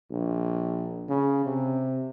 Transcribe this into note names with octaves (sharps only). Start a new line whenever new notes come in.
A#1
C#3
C3